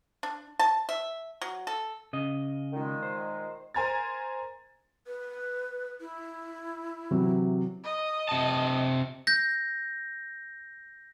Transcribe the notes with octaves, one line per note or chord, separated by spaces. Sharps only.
D4
A5
E5
F#3
A4
C#3 D#5
A#2 D#3 G#3
C5
A#4 C5 G#5 A#5 G#6 A6
B4
E4
C3 E3 F#3
D#5
C3 A5
G6 A#6